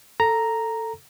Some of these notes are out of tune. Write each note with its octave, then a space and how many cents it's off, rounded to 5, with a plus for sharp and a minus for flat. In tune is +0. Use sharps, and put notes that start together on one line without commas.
A4 +10 A#5 +0